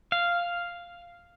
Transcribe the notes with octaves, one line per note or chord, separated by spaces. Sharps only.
F5